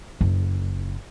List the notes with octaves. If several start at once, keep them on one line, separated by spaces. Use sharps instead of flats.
F#1